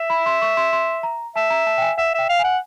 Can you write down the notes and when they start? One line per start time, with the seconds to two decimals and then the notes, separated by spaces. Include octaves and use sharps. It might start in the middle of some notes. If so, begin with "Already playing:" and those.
Already playing: E5
0.10 B5
0.26 C6
0.42 C#6
0.57 C6
0.73 C6
1.03 A#5
1.36 E5 A5
1.50 A#5
1.66 A5
1.78 G5
1.81 G#5
1.97 E5 F#5
2.14 E5 G5
2.29 F5
2.39 F#5 G#5